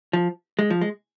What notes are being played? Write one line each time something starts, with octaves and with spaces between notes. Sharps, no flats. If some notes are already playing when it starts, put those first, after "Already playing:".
F3
G#3
F3
G#3